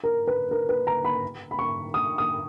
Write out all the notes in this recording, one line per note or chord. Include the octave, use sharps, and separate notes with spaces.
A#4
B4
A#4
B4
A#5
B5
B5
C#6
D#6
D#6